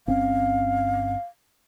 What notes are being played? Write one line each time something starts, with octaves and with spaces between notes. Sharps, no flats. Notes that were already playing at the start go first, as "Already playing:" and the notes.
G1 C4 C#4 F5